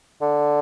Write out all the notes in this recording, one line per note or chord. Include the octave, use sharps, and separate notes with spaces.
D3